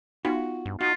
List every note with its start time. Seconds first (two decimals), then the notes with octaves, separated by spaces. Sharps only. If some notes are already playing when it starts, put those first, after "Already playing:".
0.25 B3 D#4 F4 F#4
0.66 G2
0.81 D#4 F4 F#4